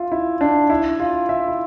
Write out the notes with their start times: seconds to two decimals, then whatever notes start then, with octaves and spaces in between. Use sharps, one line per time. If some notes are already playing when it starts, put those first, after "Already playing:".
Already playing: F4 E5
0.12 E4
0.41 D4
0.70 E4
1.00 F4
1.29 E5
1.48 E4